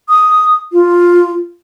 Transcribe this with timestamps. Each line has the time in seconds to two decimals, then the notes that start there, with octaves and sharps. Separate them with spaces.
0.09 D#6
0.72 F4